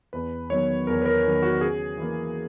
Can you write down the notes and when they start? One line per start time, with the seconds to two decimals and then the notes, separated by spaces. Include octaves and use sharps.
0.13 E2 B4
0.50 D#3 F#3 B3 C#5
0.87 E2 A#4
1.02 B4
1.06 A#4
1.24 D#3 F#3 B3
1.42 F#4
1.61 C#3 G#4
1.98 E3 A#3